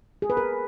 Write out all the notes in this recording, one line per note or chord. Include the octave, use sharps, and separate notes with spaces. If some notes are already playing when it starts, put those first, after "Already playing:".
G#4
B4
A#4